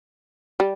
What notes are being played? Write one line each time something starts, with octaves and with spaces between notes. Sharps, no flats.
G3